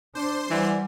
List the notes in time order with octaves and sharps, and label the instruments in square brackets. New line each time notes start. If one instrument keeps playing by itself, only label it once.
[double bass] D4 [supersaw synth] C5 C6
[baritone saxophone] E3 [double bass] G3 [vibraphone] D5 F#5 G#5